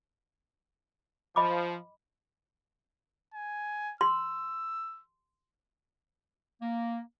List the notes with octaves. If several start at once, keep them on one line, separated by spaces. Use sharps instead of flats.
F3 D#5 B5 D6
G#5
C6 E6
A#3